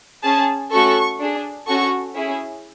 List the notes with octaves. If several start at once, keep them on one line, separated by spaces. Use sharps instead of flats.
C#4 G#4 A5
A3 C#4 F#4 A4 C#6
D4 G#4
C#4 F#4 A4 C#6
C#4 E4 G#4